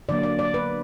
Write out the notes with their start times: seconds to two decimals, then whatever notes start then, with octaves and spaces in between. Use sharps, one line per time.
0.09 D3 F#3 A#3 D5
0.23 D5
0.39 D5
0.54 B4